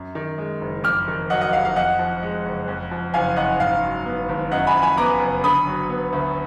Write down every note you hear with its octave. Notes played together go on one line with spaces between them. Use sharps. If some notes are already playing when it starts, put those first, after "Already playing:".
Already playing: F#2
D#3
G#3
F#1
F2 D6 F6
D#3
F#3 D#5 F#5
D#5 F#5
F1 F5
F5
F2 D#5 F#5
F3
G#3
F#1
F2
F3
F#1 F5 G#5
F#1 D#5 F#5
G#2 F5
F#3
B3
G#1
F#2 D#5 F#5
G#5 B5
F3
G#5 B5
B3 A#5 D6
F#1
D3 B5 D#6
F#3
B3
D2